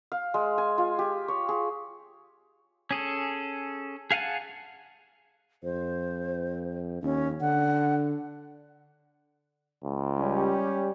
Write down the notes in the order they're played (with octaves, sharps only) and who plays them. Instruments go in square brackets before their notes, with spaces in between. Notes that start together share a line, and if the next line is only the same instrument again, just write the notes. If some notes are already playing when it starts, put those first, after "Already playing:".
[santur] F5
G#3
G#5
F4
G4
C#5
G#4
[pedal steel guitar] C#4 G#4 A4
G#4 F5 F#5 G#5 A5
[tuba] F2 [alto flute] C5
[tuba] D#2 [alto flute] C#4
[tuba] D3 [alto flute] F#5
[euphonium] C#2
[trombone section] G3 C#4 G4